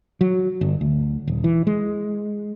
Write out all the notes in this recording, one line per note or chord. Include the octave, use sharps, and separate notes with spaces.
F#3
G1
D2
D#1
E3
G#3